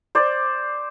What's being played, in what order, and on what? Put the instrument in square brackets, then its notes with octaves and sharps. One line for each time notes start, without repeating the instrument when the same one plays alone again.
[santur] C5 D5